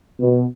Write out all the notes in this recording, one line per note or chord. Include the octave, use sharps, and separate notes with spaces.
B2